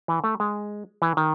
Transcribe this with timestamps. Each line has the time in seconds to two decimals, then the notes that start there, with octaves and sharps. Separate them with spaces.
0.08 E3
0.24 A3
0.40 G#3
1.02 E3
1.17 D#3